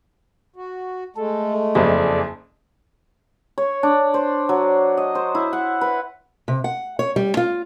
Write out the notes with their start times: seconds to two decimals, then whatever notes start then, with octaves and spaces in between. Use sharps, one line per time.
0.56 F#4
1.16 G#3 A3 A4
1.75 F#1 F2 G#4 A4 D5
3.58 C#5
3.83 D4
4.14 C5
4.49 F#3
4.97 D#5
5.15 C5
5.35 E4
5.53 F#5
5.81 B4
6.48 C3
6.64 F#5
6.99 C#5
7.16 G3
7.37 F4